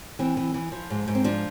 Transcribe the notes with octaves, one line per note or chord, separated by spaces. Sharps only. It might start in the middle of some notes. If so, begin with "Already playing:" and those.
E3 C4
E3
E3
F3
G#2
G#2
C4
F3 D4